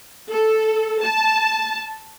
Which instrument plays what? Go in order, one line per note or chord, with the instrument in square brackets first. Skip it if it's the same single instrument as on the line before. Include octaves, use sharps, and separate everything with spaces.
[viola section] A4
A5